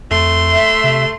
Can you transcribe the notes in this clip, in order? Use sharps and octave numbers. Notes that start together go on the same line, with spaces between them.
F2 A3 C6
E5
C3